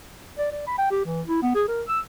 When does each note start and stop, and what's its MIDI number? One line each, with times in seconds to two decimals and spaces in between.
0.38 0.49 74
0.52 0.63 74
0.67 0.77 83
0.78 0.89 79
0.91 1.00 67
1.05 1.22 52
1.27 1.41 64
1.42 1.51 59
1.55 1.63 68
1.68 1.83 70
1.88 2.00 88